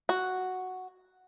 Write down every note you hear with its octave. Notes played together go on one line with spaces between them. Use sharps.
F#4